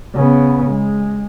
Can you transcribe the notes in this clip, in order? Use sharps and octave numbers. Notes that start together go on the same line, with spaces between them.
C#3 B3
G#3